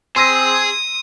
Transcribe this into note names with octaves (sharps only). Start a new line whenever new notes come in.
C4 G#4 C6 D#6 E6 A#6